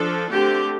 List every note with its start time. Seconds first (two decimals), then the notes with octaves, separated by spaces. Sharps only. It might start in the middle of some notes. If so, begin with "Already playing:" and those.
Already playing: F3 D4 A4
0.30 D3 A3 C4 G4